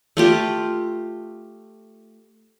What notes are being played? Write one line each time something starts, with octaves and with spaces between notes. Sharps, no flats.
A3 F4 G4